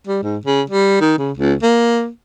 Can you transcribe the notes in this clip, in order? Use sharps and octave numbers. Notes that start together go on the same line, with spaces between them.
G3
G#2
C#3
G3
D#3
C#3
C#2
A#3